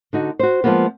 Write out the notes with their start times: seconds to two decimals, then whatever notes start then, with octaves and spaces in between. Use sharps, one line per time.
0.13 D3 D#4 F#4
0.39 F#4 C5
0.64 F3 F#3 G#3 A#3 B3